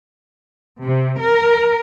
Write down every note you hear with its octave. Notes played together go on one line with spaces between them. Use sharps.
C3
A#4